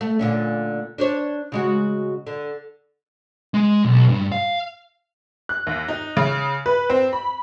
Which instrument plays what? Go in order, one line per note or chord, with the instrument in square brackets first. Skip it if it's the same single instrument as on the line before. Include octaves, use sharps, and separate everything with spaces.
[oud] A3
A#2 D3 C#4
D4 C5 C#5
C#3 G#3 F#4
D3
[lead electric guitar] G#3
B1
G2
F5
[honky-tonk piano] F#6
D#2
D#4
C#3
B4
C4
B5